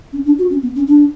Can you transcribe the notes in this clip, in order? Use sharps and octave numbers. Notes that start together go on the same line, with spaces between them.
C#4
D4
F#4
C#4
B3
C#4
D4